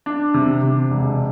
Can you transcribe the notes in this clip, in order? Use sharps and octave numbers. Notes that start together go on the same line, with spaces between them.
D4
C3
C3
E1